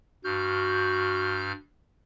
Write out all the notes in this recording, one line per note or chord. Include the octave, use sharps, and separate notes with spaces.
G2 F#4 F6 G6